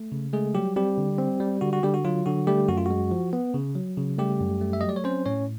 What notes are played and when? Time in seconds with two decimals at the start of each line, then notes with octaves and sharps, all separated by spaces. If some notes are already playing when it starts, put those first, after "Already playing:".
Already playing: A3
0.12 C#3
0.33 G#3 A3 G#4
0.54 F#3 G3 G4
0.76 G3 C4 G4
0.98 D3
1.18 C4
1.40 G3
1.61 D3 F#4
1.73 F#4
1.83 D3 G3 G4
1.94 F#4
2.05 F#3 F4
2.26 D3 F#4
2.47 G3 A3 G4
2.68 F#2 F#4
2.77 F4
2.86 G#3 F#4
3.11 F3
3.33 B3
3.54 C#3
3.75 F#3
3.97 C#3
4.18 G3 A3 G4
4.40 F#2
4.61 A3
4.73 E5
4.81 F#3 D#5
4.89 D5
4.96 C#5
5.04 C4 C#4 C5
5.26 A2 C#4 C#5